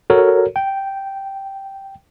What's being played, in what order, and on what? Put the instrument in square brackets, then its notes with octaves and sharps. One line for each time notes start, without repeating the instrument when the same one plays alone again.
[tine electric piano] F#4 A4 A#4 C#5
G5